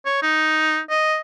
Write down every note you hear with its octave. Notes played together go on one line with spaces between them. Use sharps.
C#5
D#4
D#5